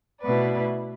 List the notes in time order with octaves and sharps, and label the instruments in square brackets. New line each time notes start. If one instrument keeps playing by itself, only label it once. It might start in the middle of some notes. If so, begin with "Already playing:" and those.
[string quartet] B2 A3 E4 B4 D5